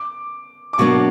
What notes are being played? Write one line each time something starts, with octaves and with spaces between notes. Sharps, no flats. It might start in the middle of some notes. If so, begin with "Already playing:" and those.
Already playing: D6
D6
B2 F#3 A#3 D4 C#6